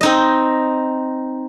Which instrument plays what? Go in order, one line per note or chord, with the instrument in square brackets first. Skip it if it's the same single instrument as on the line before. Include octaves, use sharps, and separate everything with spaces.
[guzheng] C4 D#4 D#5